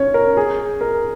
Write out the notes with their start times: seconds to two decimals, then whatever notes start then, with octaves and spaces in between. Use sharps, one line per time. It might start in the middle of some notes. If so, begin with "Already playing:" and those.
Already playing: C#4 C#5
0.14 A#4
0.37 G#4
0.81 A#4